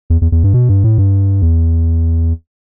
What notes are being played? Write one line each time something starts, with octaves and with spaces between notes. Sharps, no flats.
E2
E2
E2
G2
B2
G2
A2
G2
E2